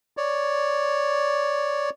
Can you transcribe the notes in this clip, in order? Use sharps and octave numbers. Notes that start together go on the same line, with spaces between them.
C#5 D5